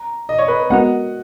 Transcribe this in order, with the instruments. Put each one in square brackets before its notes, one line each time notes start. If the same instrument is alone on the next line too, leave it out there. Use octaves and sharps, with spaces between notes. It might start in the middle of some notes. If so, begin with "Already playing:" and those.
Already playing: [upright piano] A#5
D#5
C#5
B4 D#5
[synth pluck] G#3 B3 F#4 A#4 [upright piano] D#5 F#5